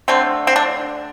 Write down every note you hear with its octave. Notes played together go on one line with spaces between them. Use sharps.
D3 A3 C4
C4
D4